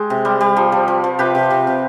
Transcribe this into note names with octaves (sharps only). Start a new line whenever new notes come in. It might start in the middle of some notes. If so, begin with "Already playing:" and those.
Already playing: G#3 G4
C3
G3
G3
F3
F3
F3
F3
C3 G4 B4
C3
C3
C3